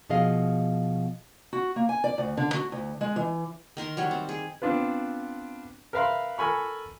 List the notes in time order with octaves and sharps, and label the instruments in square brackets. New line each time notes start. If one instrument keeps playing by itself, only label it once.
[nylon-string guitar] B2 F3 G#4 D#5 F5
[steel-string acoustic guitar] F#4
A#3
G#5
D5
D2
D3
F#4
D2
G#3
E3
[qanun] D#3 A#4 C6
F#3 G3 C#5
C4
G#4
[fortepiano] B3 C4 D4 F4 B4
A#4 B4 E5 F5 B5 C6
A4 A#4 G#5 B5 C#6